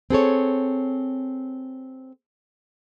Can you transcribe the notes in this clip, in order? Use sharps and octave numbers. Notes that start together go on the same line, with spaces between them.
C4 G#4 A4 C#5